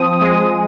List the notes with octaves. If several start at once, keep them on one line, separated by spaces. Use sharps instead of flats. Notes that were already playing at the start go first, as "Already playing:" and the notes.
Already playing: F3 C4 D#6
G#3